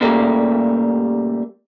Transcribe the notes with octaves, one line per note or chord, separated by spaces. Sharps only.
A#2 C#3 G3 A3 A#3 G4